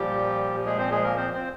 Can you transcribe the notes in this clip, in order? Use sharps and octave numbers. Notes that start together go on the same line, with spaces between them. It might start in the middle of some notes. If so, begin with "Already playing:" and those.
Already playing: A#2 F3 G3 G4
G#3 G#4
C4 C5
G#3 G#4
A#3 A#4
C4 C5
C4 C5